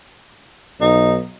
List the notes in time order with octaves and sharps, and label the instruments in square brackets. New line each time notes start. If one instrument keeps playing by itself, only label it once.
[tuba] B1 [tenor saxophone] D#4